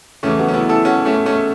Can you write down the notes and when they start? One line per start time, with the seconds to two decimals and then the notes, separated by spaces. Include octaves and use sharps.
0.23 E2 C#3 E3 A3 C#4
0.38 F#3 B3
0.48 C#4
0.53 B3 E4
0.69 E4 A4
0.85 C#4 F#4
1.05 A3 C#4
1.26 A3 C#4